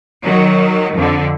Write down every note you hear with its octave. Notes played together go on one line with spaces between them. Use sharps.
D#3 F#3
F2 D3